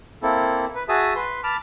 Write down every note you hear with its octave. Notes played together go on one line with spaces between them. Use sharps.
A#3 C4 E4 A4
B4
F#4 G#4 E5 A5 D#6
B4 C6
A5 B5 D6 F6